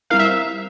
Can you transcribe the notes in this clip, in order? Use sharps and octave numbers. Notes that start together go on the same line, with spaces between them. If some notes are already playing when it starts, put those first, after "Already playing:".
G3 C4 E4 A#4 F5
E5